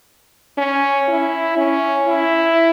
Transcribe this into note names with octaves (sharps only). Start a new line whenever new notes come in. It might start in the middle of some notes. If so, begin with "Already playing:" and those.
C#4
E4
C#4
E4